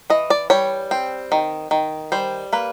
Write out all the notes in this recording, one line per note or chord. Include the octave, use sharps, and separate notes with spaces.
E3 D#5
D5
G3 C#5
C4
D#3
D#3
G3 C5
A#3 B4